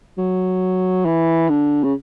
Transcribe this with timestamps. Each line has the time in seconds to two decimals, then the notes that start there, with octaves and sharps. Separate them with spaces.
0.18 F#3
1.06 E3
1.49 D3
1.84 C#3